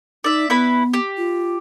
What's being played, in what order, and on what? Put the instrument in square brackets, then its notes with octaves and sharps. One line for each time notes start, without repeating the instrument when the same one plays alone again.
[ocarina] D#4 [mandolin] D5 E5
[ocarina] B3 [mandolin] E4 B4 B5
[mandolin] G4
[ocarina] F4